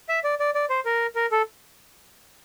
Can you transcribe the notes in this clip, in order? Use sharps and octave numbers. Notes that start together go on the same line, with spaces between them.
E5
D5
D5
D5
C5
A#4
A#4
A4